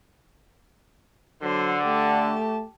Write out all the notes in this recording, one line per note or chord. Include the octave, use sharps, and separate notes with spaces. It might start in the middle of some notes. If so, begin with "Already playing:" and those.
D3 F#3 C5
A3 G4 A5